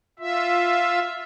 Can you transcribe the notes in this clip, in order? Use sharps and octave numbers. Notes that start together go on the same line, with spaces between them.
F4 E5